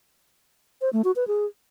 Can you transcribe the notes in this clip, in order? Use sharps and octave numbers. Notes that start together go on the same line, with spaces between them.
C5
A3
F#4
B4
G#4